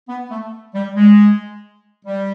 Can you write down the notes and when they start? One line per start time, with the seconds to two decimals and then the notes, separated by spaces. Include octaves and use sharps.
0.09 B3
0.31 A3
0.75 G3
0.96 G#3
2.05 G3